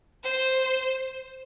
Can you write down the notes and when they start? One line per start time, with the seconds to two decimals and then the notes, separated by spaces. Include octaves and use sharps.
0.24 C5